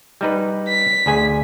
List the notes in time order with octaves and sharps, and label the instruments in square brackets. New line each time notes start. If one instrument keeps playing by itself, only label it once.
[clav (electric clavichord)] G3 D#4 B4
[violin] B6
[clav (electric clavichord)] D2 G#4 G#5